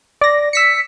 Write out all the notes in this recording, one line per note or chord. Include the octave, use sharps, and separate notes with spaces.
D5 A#6
E6 B6 C#7